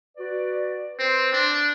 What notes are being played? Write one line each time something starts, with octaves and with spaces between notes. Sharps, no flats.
F#4 B4 D5
C4 B4 C5
D4